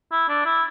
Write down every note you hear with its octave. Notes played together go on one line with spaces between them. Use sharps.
E4
D4
E4